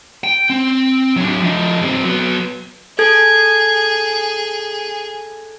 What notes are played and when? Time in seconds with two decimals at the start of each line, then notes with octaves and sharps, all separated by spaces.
0.24 G5
0.50 C4
1.17 F#3 D4
1.43 F3 D#4
1.82 G2 C4
2.05 F#3 B3
2.99 G#4 A4 G#6